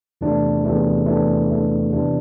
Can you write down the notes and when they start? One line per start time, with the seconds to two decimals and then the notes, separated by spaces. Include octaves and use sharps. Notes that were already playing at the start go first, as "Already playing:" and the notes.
0.21 E2 C3 E3 A3 D4
0.64 E2 C3 E3 A3 D4
1.06 E2 C3 E3 A3 D4
1.49 E2 C3 E3 A3 D4
1.91 C3 E3 B3 D4